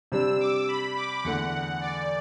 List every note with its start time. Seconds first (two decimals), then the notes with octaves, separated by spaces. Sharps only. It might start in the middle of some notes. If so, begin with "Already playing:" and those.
0.12 C3 G3 D4 E6
0.40 D6
0.68 B5
0.96 D6
1.24 E2 D3 A3 F#5
1.81 D5